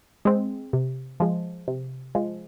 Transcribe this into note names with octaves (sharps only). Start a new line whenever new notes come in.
G#3 C4
C3
F3 G#3
C3
F3 G#3